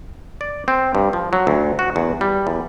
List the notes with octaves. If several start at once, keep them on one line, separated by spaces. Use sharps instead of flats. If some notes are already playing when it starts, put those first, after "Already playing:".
D5
C4
G2
F3
F#3
D2
F#4
E2
G3
E2